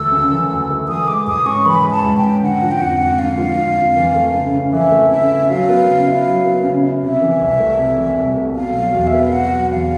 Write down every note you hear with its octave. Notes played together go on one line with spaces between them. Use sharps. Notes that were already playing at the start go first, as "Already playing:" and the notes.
Already playing: D2 E3 A3 E6
C#3
E3
D2
A3
E3 D#6
G#3 D6
G#2 D#6
C#4 C#6
E3 B5
G#3
A5
G#2
G5
C#4
D3 F#5
F3
G5
F2 F#5
F2
D3 F5
F3
F2
F2
E3
A3
C#3
C#3
E3 E5
A3
C#3 E5
C#3
F#3 F5
B3
C#3
E4
F#3
B3
C#3
E4
C3 E5
E3
C2
A3
C3
E3
C2
A3
B2 F5
F#3
E2
E5
B3
F5
B2 F#5
F#3
E2 F5